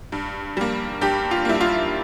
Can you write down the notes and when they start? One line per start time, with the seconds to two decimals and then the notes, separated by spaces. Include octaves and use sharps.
0.12 G2
0.57 G3 A#3
1.01 G2 G4
1.31 F4
1.45 G3 A#3 E4
1.61 F4